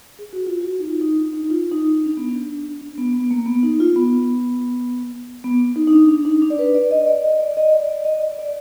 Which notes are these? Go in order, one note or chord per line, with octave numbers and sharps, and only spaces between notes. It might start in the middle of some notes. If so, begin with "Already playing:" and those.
G#4
F#4
F4
F#4
D#4
F4
D#4
D4
D#4
F4
D#4
D#4
D4
B3
D4
D4
B3
B3
A#3
B3
D#4
F4
B3
B3
D#4
D#4
D4
D4
D#4
D4
D5
B4
D5
D#5
D5
D#5
D5
D#5
D5
D5
D5
D#5
D5
D5